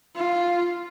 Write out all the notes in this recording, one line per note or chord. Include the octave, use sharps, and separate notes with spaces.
F4